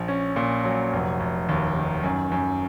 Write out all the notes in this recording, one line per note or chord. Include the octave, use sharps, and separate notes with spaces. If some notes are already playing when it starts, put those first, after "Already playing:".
Already playing: A#1
C#4
A#2
F#3
F1
F1
D#2
D#3
F#2
F#2